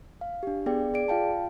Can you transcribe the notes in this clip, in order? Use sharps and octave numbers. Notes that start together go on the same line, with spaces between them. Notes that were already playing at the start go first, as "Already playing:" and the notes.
F5
D4 G4
B3 G#4 D5 G5
G#4 D5 D7
F4 F5 G5 A5